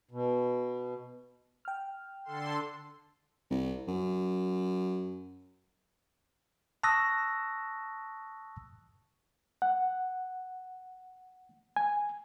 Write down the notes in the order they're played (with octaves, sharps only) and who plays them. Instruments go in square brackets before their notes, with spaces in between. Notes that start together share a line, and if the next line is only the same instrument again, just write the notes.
[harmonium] B2
[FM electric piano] G5 F6
[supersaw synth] D3 A4 C6
[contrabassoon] C2
F#2
[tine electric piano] A5 C#6 D#6 E6 F#6 A#6
[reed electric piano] F#5
G#5